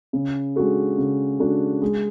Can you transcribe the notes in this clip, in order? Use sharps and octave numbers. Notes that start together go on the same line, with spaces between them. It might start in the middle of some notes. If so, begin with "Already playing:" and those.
C#3
G#3 D4 F#4 A4
C#3
G#3 D4 F#4 A4
G#3